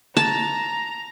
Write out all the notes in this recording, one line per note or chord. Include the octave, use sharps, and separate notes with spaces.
A5 A#5